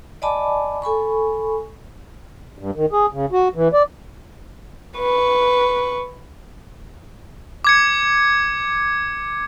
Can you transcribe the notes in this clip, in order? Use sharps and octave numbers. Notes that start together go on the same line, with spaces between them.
D5 D#5 G#5 A5 B5 D6
A4 G#5 B5 C#6
G2
D#3
G#4
C#3
F#4
E3
D5
B4 C#6
D6 G#6 C#7